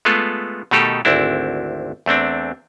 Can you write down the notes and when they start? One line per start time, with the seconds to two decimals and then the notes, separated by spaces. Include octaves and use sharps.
0.05 G#3 A3 B3 F4 A4
0.71 B2 D#3 A3 D#4 G4 A4
1.05 G#1 D2 C4 D4 E4
2.06 E2 A3 C4 D4